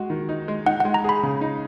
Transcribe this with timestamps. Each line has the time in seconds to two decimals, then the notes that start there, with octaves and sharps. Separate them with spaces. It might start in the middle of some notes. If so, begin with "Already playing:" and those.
Already playing: G#3 F#4
0.10 D#3
0.29 D#4
0.48 G#3
0.66 D#4 F#5
0.80 G#3 F#5
0.94 A#5
1.04 G#4 B5
1.23 C#3
1.41 D#4